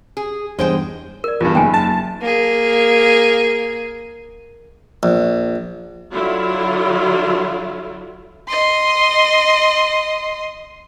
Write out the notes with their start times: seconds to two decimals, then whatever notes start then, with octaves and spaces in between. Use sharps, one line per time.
0.17 G#4
0.59 E2 G2 G#3 C5 G5
1.24 A#4 D5
1.41 E2 G2 F4
1.55 F#1 F#3 A#3 D#4 G5 G#5
1.74 A5
2.21 A#3 G#4
5.03 A#1
6.13 D3 F#3 E4 F4
8.48 D#5 C6